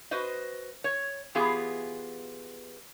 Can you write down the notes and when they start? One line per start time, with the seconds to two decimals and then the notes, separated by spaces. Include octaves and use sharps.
0.11 F#4 B4 C5 D#5
0.84 C#5
1.35 E3 B3 F4 G4 G#4